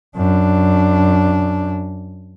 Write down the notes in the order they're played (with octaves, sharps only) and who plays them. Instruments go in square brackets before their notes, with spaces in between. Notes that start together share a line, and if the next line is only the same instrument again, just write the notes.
[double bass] F#2 D4